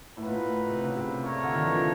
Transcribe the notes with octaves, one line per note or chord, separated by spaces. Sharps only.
A2 D#4 F#4 B4
A#2
A2
C3
C#3
C3
A3 D4 F4 A#4 C#5
D3
D#3
E3
F3